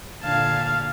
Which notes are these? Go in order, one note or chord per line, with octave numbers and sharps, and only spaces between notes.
A#2 D3 F5 A5 G#6